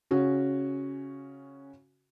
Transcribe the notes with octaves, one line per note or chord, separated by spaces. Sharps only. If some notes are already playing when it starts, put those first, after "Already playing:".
C#3 C#4 F#4